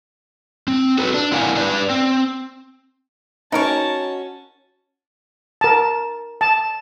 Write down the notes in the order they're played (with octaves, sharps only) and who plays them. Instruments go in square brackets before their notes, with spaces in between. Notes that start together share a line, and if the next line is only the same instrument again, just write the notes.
[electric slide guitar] C4
F#4 A4 B4
D4
C4 E4 A#4 F5 F#5 G#5
D4 G4 B4 D5
C4
[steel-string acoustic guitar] C#4 F#4 [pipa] D#4 A#4 C#5 [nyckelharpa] A5
[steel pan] A#4 A5
A5